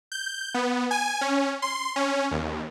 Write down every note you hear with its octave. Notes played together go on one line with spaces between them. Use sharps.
G6
B3
G#5
C#4
C6
C#4
D#2